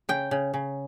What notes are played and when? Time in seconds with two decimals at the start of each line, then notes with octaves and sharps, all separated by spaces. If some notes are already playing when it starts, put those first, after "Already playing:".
0.09 C#3 G5
0.31 C#3
0.54 C#3